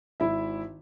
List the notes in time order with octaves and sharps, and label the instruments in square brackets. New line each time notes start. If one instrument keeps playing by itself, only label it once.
[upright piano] G#1 E4 E5